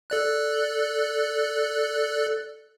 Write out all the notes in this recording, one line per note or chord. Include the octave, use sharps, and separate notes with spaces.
A4 D5 F#6